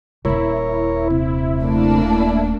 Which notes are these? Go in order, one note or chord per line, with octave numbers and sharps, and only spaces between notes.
D#1 G#1 E4 A#4 C#5
C3
A3 A#3 D4